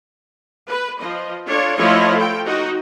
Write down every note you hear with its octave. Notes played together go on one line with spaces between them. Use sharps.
B4
F3 D#5
D4 F4 A4 C#5
F3 A3 E4 F4 C#5 D#5
A4 G5
D#4 F#4